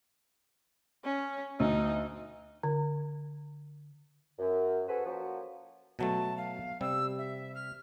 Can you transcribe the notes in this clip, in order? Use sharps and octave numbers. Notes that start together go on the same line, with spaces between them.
C#4
D2 D#4
D3
F#2
F#4 G#4 A4 B4 C5
F3 A#3 C#4 F#4
B2 F#3 A3 A5
F5
C3 G3 E6
E5
F6